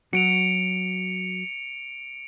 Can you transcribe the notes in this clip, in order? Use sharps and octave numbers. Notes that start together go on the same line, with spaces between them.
F#3 F#4 C#7 D7 F7